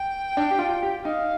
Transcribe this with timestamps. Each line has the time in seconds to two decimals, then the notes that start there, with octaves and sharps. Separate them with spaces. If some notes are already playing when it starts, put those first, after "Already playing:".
Already playing: G5
0.37 D4
0.51 G4
0.59 F4
0.83 G4
1.05 D#4 F5